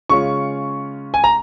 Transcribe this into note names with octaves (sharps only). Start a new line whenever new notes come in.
C#3 G#3 C#4 F4 C#6
G#5
A#5